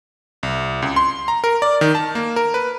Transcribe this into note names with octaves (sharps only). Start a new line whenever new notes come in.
C2
C#2
C6
A#5
A#4
D5
D#3
A5
A#3
A#4
B4